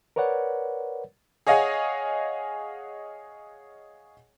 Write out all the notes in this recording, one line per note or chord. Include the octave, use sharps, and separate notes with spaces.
A#4 B4 C#5 D5 F#5
G#4 C#5 D#5 F5 F#5 G#5